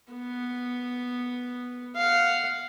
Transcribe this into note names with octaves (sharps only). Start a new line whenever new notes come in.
B3
F5 F#5